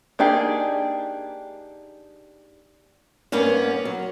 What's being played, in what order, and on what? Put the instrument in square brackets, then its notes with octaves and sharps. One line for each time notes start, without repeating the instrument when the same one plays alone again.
[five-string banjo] A#3 D4 D#4 G4 G#4
[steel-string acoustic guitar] G2 A#3 B3 C#4
F#3